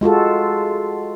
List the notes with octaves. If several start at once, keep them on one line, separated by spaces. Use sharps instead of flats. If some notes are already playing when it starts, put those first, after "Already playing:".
G#3 F4 F#4 A4